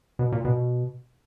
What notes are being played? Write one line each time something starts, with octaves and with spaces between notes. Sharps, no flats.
B2
A#2
B2